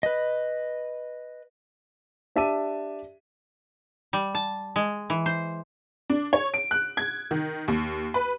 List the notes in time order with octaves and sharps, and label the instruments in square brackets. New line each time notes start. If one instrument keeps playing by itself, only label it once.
[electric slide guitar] B4 D#5
[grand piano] D4 G4 E5 A5 D6 D#7
[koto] G3
A5
G#3
E3
C5
[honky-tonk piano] D4
C#5
D7
F#6
G#6
D#3
D#2
B4